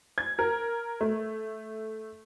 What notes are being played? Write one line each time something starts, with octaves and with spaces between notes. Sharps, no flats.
G#6
A#4
A3